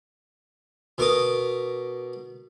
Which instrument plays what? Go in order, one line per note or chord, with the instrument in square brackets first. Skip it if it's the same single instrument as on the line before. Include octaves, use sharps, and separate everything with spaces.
[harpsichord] B2 A#4 D6 D#6